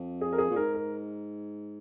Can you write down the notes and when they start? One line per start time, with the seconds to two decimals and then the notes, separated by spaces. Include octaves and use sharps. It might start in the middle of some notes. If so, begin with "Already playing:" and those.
Already playing: F2
0.21 G#4
0.33 A#4
0.38 G#4
0.50 A#2
0.56 G#2 A#4
0.75 A#4